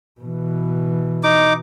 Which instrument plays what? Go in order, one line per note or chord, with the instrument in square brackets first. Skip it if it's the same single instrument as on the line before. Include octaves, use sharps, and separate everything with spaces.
[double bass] B2 E3
[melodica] D#4 D6